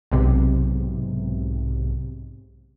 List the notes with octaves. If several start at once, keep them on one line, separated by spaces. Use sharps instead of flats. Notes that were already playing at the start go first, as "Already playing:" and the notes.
B1 G#2 C3